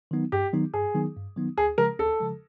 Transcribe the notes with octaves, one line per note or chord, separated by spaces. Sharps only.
D#3 F#3 B3 D#4
G2 G4
D#3 F#3 B3 D#4
G2 G#4
D#3 F#3 B3 D#4
G2
D#3 F#3 B3 D#4
D2 G#4
C#3 F3 G#3 A#4
D2 A4
C#3 F3 G#3